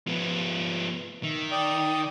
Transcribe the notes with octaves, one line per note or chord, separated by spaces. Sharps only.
F3 B3
D#3 E5
D5 G5 D#6